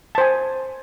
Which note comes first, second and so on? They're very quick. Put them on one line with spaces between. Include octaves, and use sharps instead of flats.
A5 C5 G#5